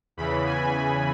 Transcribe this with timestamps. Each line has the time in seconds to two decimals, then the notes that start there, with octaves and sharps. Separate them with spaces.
0.17 E2 C#3 E3 B5
0.47 G#5